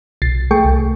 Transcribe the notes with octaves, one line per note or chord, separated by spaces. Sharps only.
B1 A6 C7
A3 G#4 G5 C#6
C2